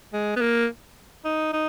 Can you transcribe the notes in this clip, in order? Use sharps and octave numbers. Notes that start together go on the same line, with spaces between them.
G#3
B3
A#3
D#4
D#4